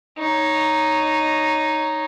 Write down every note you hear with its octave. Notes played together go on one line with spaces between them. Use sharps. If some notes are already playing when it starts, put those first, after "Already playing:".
D#4 C#5